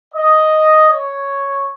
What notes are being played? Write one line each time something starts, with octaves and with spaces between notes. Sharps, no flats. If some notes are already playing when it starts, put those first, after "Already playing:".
D#5
C#5